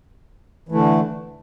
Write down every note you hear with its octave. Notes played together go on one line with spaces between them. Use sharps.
D3 E3 A3